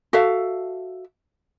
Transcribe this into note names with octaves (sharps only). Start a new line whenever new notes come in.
F#4 A4 E5 F5